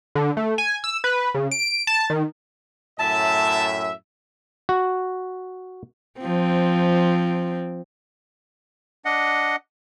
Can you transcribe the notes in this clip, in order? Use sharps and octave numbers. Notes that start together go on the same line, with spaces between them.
D3
A3
G#5
E6
B4
C#3
D7
A5
D#3
F#2 A2 E5 A5
F#4
F3 C4
D4 D#5 F#5